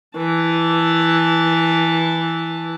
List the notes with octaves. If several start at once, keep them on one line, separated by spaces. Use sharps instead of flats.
E3 A5